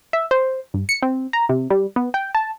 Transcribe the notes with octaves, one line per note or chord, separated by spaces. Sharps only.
E5
C5
G2
C#7
C4
A#5
C3
G3
B3
G5
A5